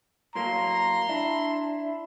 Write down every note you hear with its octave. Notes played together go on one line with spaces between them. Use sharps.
A2 F#3 A#3 A#5 C6
D4 E4